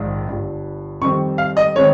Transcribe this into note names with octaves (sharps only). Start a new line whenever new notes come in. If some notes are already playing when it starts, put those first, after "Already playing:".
Already playing: A#1 G#2 D#3 G#3
G1 G2 G3
F2 D#3 G3 C4 C#6
F5
D#5
D#3 G#3 C4 C#5